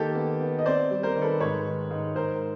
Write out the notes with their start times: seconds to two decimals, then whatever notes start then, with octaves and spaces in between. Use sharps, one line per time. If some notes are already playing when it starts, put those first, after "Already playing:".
Already playing: D#3 A#3 G4 A4
0.15 B3
0.41 B3
0.59 D#5
0.65 C4 C5 D5
0.91 G3
1.03 A#4 C5
1.15 D#3
1.22 A4 B4
1.40 G#2 B4 C#5
1.66 D#3
1.91 G#2
2.15 G#2 A#4 C5